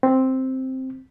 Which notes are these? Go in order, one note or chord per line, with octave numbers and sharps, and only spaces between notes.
C4